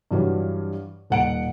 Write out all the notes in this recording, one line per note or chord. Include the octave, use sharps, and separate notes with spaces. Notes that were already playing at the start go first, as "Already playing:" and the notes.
G2 E3 F#3 G3
D#1 F#5 D7